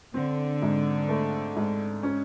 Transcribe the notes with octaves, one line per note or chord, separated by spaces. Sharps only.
D3 C4
G#2
A3
G#2
C#4